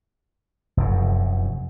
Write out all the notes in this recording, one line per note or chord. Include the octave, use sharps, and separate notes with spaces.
F1 F#2